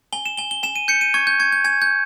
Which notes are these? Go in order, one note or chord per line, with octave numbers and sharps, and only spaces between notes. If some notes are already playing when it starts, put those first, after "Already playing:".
G#5 G7
E7
G#5 G7
G7
G#5 E7
D#7
G6 C#7
D#7
C#6 G#6
G6
C#6 G#6
G6
G#5 G#6
G6